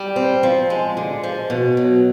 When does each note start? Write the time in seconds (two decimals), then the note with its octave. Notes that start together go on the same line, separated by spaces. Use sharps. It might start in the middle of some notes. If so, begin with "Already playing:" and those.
Already playing: G3
0.16 C4
0.43 F3
0.70 G#3
0.97 D3
1.23 F3
1.50 B2
1.77 F#3